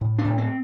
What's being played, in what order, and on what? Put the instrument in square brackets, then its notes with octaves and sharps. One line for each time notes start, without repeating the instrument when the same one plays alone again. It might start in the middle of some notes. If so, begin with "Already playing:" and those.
[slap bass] A2
D4
A2
C4